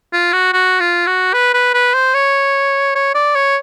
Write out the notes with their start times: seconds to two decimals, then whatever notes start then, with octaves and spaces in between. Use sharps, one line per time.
0.13 F4
0.33 F#4
0.53 F#4
0.80 F4
1.07 F#4
1.33 B4
1.54 B4
1.74 B4
1.94 C5
2.14 C#5
2.95 C#5
3.15 D5
3.36 C#5